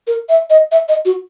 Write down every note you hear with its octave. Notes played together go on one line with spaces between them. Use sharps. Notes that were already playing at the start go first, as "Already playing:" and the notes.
A#4
E5
D#5
E5
D#5
F#4